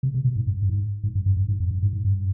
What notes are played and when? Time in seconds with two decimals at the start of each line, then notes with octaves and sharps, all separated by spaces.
0.03 C3
0.14 C3
0.25 B2
0.36 G#2
0.47 G2
0.62 G2
0.69 G#2
1.04 G#2
1.15 G2
1.26 G2
1.37 G2
1.49 G#2
1.60 F2
1.71 G2
1.83 G#2
1.93 G#2
2.05 G2